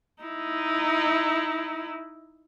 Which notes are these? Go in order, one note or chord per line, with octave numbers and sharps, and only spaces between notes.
D#4 E4